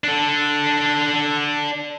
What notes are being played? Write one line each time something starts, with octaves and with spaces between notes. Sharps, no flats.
D4 A4